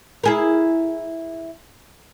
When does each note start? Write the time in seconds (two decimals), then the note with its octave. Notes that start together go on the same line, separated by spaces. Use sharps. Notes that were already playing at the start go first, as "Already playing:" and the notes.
0.24 E4 G#4 A#4